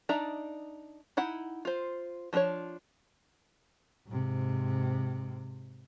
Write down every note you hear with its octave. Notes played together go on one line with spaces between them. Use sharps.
D4 D#4 D5 E5 A#5
D#4 E4 F#5
F4 C5
F3 A3 D4 F4 C#5
G#2 C3